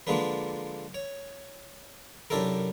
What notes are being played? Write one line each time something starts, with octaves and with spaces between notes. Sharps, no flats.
D3 F3 G#3 A#3 D4 B4
C#5
F#2 C3 D4 E4 A4 A#4